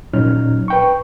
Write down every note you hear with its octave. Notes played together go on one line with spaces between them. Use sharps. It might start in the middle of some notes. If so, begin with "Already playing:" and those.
A#2 F#3 C#4 D#4 F6
B4 G5 C#6